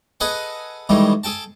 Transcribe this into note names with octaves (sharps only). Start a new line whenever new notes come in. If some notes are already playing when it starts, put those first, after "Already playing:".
G#4 A4 B4 D#5 F#5 G#5
A2 D#3 E3 G3 G#3
G#4 A4 G5 A5